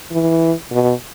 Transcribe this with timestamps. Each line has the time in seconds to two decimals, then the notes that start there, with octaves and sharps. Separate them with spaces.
0.12 E3
0.72 B2